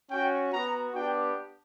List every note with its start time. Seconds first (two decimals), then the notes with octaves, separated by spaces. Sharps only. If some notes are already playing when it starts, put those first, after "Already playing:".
0.11 C#4 F#4 G5
0.52 B3 F#4 A#5
0.93 B3 D4 G4 G5